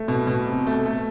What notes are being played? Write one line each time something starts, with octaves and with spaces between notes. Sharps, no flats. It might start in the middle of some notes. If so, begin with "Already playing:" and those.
Already playing: A3
B2
B2
C3
A3
A3